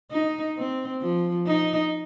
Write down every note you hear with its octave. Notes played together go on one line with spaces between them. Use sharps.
D#4
C4
F3
D#4